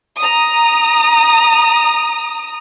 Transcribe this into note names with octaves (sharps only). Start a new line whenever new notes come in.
A#5 D#6